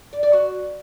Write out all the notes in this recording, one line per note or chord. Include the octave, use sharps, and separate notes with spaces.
D5
D5
F#4